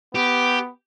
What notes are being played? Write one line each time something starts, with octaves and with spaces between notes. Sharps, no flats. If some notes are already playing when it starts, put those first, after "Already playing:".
B3 G4